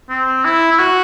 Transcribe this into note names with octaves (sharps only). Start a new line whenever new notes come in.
C4
E4
E4
F#4